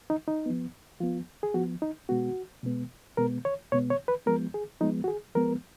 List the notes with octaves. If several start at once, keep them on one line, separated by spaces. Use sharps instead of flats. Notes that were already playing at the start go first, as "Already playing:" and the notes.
D#4
D#4
F3 B3
F3 B3 F4
G#4
F3 B3 F#4
D#4
B2 G#3 B3 F#4
B2 G#3 B3
B2 G#3 B3 A#4
C#5
B2 G#3 B3 C#5
C#5
B4
F3 G#3 B3 A#4
G#4
F3 G#3 B3 D#4
F#4
G#4
F3 G#3 B3 A#4